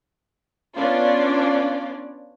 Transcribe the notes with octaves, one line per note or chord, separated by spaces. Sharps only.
B3 C#4 D4 F4 D5